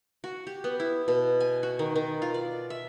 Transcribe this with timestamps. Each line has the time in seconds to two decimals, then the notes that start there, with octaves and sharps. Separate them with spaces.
0.24 F#4
0.47 G4
0.64 B3
0.80 E4
1.08 B2
1.40 G#5
1.63 F#4
1.79 D#3
1.96 D#3
2.22 F4
2.34 D5
2.70 E5